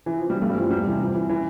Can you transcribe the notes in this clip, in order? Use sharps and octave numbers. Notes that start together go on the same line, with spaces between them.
E3
F3
G3
G2 A3
G3
E3 F3
E2 G3
C3 E3
F2
E3
E3